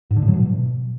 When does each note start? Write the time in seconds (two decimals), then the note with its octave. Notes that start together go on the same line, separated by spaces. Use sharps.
0.11 G#2
0.16 D3
0.22 A2
0.28 F#3
0.34 B2